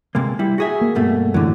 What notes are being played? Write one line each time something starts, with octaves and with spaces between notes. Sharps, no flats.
C3 G#3 A#3
G3 E4
F#4 G#4 E5
A#3
G2 B2 A3
F#2 A2 D3 E3 F#3